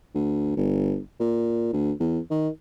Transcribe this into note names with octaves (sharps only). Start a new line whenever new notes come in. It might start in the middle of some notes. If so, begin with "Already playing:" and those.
D2
G1
A#2
D2
E2
D#3